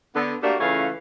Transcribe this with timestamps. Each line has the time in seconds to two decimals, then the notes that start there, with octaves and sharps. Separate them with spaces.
0.15 D3 B3
0.43 A3 A#3 D4 F#4 G4 A#4
0.59 C#3 E3 A3 C#4 F4 F5